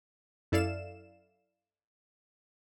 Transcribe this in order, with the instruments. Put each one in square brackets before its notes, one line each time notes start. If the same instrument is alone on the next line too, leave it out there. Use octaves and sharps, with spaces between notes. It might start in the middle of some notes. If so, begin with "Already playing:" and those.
[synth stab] F#2 E4 A4 D5 F5 E7